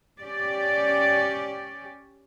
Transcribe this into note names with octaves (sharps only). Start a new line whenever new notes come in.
C#4 G4 D5